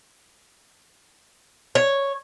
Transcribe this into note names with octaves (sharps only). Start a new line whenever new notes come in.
C#5